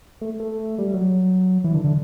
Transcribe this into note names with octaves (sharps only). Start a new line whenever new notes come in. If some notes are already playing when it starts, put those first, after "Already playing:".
A3
A3
G3
F#3
E3
D3
D3